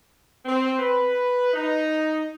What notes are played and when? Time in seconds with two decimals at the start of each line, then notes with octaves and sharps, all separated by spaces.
0.46 C4
0.79 B4
1.54 D#4